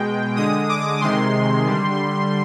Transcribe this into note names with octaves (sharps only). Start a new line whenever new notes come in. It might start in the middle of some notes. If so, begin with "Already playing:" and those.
Already playing: B2 G#3 G5
D3 G#3 D#6
D6
C3 D#3 G#3 C6
D3 G3